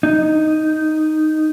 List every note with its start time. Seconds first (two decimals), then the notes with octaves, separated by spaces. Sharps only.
0.03 D#4